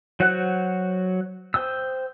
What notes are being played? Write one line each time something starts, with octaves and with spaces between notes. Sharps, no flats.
F#3 F#4 C5 F#5 F#6
C5 G5 D#6 E6